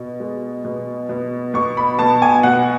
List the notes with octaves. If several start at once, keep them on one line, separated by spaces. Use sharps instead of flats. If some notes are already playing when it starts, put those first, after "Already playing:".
Already playing: B2
G#3
B2
B2
B2 C#6
B5
B2 A5
G#5
B2 F#5